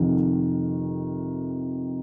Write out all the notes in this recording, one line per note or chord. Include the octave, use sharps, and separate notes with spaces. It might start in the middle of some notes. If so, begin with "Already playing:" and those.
Already playing: F2 C3 D#3